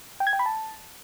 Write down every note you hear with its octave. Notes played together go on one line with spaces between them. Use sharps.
G5
G#6
G5
B5
A5